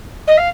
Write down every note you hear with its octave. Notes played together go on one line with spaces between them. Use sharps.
D#5
F5